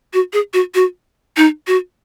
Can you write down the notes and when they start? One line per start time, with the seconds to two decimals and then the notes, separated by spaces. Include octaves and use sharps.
0.14 F#4
0.33 G#4
0.54 F#4
0.75 F#4
1.37 D#4
1.67 F#4